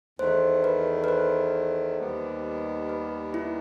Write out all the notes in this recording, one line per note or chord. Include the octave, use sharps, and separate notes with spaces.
E2 D#3 A3 C5
B4
B4
C5
D#2 D#3 G3 B3
B4
E4